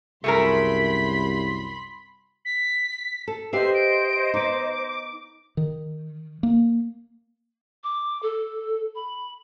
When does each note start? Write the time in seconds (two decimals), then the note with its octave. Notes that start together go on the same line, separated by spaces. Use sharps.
0.24 C2 F#2 A3 G#4 A#4 B5 C6 B6
2.45 B6
3.27 A4
3.53 G4 B4 C5 D#5 E5 C7
3.74 D7
4.34 B3 D#4 D6
5.57 D#3
6.43 A#3
7.84 D6
8.23 A4
8.95 B5